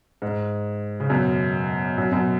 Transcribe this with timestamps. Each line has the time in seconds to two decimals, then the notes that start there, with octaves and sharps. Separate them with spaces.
0.22 G#2
1.00 C#3
1.10 F#2 B2
1.98 F#2
2.11 F#2 B2